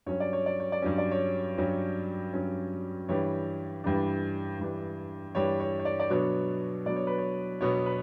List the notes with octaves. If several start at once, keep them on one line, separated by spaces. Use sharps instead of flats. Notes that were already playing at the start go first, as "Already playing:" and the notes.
G2 F#3 C#4 C#5
D5
C#5
D5
C#5
D5
G2 F#3 C#4 C#5
D5
C#5
G2 F#3 C#4
G2 F#3 C#4
G2 E3 G3 D4 C#5
G2 E3 G3 D4
G2 E3 G3 D4
G2 E3 G3 D4 C#5
C#5
C#5
D5
D5
B2 F#3 B3 D4 C#5
B2 F#3 B3 D4 D5
C#5
B4
C#5
B2 F#3 B3 D4 C#5
B4